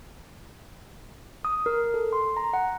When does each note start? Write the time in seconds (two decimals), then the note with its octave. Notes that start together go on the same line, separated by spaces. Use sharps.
1.45 D#6
1.66 A#4
1.94 A4
2.13 C6
2.37 A#5
2.53 F#5